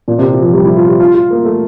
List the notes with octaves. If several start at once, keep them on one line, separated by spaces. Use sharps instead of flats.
A#2
C3
E3
F3
G3
E4
F4
G4
F4
F4
A#3
A3